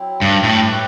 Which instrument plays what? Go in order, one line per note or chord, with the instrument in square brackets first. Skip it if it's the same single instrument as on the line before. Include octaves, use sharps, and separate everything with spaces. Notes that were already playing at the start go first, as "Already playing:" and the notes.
Already playing: [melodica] F#3 C4 E4
[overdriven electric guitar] G2
A2
[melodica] A3 E4 G4 B4